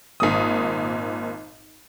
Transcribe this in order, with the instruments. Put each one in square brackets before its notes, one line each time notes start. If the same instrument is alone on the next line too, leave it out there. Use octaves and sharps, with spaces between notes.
[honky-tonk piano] G#1 A#2 D#6